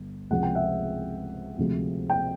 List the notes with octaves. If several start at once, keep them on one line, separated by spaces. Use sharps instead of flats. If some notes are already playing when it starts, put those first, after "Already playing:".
Already playing: G1
C#2 C3 F3 G#3 F#5
G5
E5 F#5
D2 C3 F3 G#3
G5